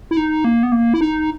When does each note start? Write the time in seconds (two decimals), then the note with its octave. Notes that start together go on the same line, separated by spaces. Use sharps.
0.11 E4
0.17 D#4
0.45 A#3
0.63 B3
0.72 A#3
0.94 E4
1.01 D#4